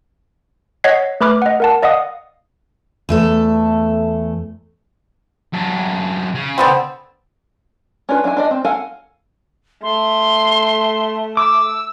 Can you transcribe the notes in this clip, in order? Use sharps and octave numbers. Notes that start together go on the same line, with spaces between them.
C#5 D#5 F#5 G#6 B6 C7
A3 B4 B5 D6 F6
D#5 F#5
A#4 F#5 A5
D5 D#5 F5 F#5 D#6
E2 A3 A4
F#2 D4
C#3
D3 B3 C4
C#4 D4 F4 B4
F#3 D4 E4 G#5
D4 D5 D#5
C4
A4 A#4 F5 F#5 G#5
A3 C6
D6 E6